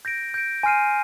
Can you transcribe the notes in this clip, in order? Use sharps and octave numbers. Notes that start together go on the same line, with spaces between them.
G6 A#6 D7
G6 A#6 D7
G#5 C6 F6 C7 D#7